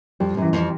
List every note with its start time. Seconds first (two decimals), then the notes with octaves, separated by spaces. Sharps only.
0.20 F2 G3
0.37 F#2 E3
0.53 F2